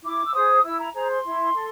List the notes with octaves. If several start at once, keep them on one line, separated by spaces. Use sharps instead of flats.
E4 D6
E6
G#4 C5 D#6
E4 E6
A#5
G#4 C5 A#5
C6
E4
A4